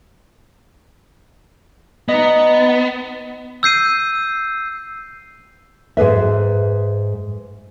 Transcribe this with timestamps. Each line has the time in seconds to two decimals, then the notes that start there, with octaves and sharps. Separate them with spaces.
2.08 B3 D#4 D#5
3.63 E6 G6 C7 D#7
5.97 G#2 G#4 B4 E5